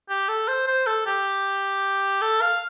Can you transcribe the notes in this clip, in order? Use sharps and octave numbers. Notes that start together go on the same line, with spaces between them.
G4
A4
C5
C5
A4
G4
A4
F5